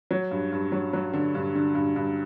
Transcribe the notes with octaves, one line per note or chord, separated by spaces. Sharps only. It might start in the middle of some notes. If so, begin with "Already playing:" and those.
F#3
G2
G2
F#3
F#3
D3
G2
D3
G2
G2